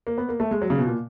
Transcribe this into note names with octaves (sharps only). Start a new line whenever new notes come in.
A#3
B3
A#3
A3
G#3
F#3
C#3
B2
A#2